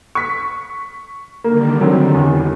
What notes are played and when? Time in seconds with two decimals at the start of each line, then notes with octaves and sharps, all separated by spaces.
0.15 C#6 B6
1.44 D3 D#3 G3 A#3
1.81 F#3 C4
2.14 E2